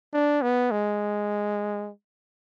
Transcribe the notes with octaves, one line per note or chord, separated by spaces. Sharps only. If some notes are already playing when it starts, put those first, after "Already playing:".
D4
B3
G#3